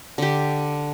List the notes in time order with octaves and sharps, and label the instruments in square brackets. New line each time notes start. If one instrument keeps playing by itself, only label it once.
[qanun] D3 G4